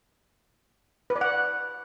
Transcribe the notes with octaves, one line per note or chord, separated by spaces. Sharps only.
B4
D5
F#5